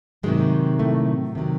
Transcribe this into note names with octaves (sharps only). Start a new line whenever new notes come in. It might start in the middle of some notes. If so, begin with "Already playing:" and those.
G#2 C3 D#3 F#3 G#3
A2 A3
C3 D#3 F#3